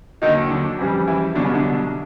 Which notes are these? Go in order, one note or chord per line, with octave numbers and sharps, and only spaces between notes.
D#2 D3 D#3 F#3 D#4
D3 D4
F2 C#3 E3 G3
E3 E4
C2 B2 D3 F#3 D4
C#3 C#4
D3 D4